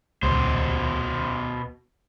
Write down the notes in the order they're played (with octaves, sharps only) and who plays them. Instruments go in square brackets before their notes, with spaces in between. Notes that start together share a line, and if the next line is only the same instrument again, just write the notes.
[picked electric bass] D#1 C#2 [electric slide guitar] B2 C5